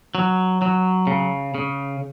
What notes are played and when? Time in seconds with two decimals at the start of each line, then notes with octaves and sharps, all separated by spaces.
0.15 F#3
0.62 F#3
1.07 C#3
1.55 C#3